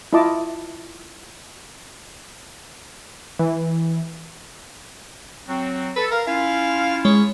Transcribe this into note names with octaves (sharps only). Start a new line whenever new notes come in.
E4 F4 D#5 A5 D6
E3
F#3 C4 F#4
A4 B4
A#4 F5
C#4 E4 F4 F5
G#3 C#5